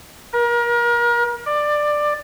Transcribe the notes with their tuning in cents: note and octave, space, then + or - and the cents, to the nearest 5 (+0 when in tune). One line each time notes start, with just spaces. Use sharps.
A#4 +35
D5 +15